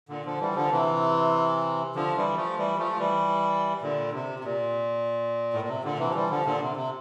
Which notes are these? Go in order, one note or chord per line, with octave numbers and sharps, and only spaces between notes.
A#2 D3
D3 F3
E3 G3
D3 F3
C3 E3
D3 F3
E3 G3
F3 A3
E3 G3
F3 A3
F3
E3 G3
A#2 D3
C3
C3
A#2
A2
A#2
C3
A#2 D3
C3 E3
F3
E3 G3
D3 F3
A#2 D3
C3
C3